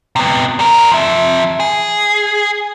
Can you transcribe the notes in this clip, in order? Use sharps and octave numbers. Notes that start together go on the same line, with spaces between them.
C3 B3
G3 A#4
F3 E5
G#4